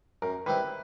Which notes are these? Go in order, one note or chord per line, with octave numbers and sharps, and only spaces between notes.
F#2 A#4
D#3 G3 C4 E4 B4